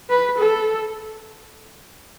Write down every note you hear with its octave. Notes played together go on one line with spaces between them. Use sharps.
B4
A4